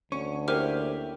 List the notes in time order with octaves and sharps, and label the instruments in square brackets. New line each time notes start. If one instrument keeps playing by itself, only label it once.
[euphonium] D2 [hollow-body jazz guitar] C#4 [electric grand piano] C#6
[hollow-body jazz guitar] A#3 C#4 E4 [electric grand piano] G4 [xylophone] A#4 C5 F6